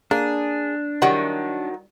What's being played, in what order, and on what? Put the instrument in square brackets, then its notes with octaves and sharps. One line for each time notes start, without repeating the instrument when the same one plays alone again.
[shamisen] A#3 [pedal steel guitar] D4 [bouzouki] G#4
[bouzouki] D#3 F#3 [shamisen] G3 E4 F#4